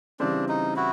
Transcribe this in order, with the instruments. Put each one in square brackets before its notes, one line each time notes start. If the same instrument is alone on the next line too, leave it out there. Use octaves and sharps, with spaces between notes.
[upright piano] C#3 E3 G3 C4 [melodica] D4
[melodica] D#4
E4 F#4